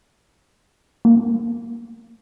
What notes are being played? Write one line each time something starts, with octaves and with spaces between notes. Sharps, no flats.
A#3